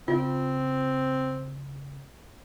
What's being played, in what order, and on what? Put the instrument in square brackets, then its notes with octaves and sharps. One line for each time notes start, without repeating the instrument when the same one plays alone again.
[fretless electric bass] C#3 [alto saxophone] C4 [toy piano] F4